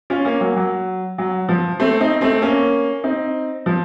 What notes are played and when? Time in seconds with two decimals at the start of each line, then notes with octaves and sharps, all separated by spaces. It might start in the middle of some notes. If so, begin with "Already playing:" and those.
0.10 C#4 F4
0.25 A#3 C#4
0.40 F#3 A#3
0.56 F#3
1.18 F#3
1.49 F3
1.80 A3 C4
2.00 C4 D#4
2.21 A3 C4
2.42 A#3 C#4
3.04 C4 D#4
3.66 F3